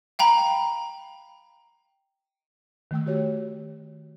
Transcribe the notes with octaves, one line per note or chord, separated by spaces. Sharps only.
F5 G5 A#5 B5
D#3 A3 G5 E6
F#4 G4 C#5